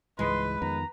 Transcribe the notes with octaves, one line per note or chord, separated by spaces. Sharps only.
C#2 G#2 E3 G#3 B4 C6
F2 D#3 B3 A#5